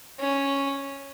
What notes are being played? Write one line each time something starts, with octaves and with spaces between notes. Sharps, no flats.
C#4